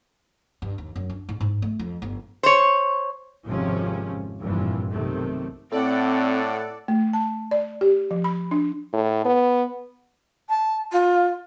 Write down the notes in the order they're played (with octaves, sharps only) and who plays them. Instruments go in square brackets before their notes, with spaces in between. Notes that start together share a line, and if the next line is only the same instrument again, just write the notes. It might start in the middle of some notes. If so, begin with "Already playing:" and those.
[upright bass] G2
D#2
F#2
D4
G#2
G#2
A3
F2
G1
[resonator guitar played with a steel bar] C5 C#5
[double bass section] G#1 F2 C3 F3 C#4
F1 G2 A#2 E3 F3
B1 C3 D#3 A3
[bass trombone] A2 [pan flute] C4 [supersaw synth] A4 D5 F#5
[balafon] A3
A5
D5
G4
F3
B5
D4
[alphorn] A2
B3
[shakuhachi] A5
F4